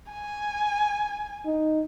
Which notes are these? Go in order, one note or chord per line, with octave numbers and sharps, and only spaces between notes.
G#5
D#4